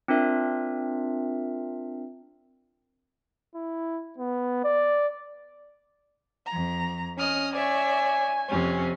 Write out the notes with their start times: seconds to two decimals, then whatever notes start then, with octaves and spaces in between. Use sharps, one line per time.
0.08 C4 D4 F4 A#4 E5
3.55 E4
4.18 B3
4.64 D5
6.47 F2 A#5
7.18 C#4 D#5 D#6 F6
7.54 C#5 D5 E5 G#5
8.49 F2 C3 C#4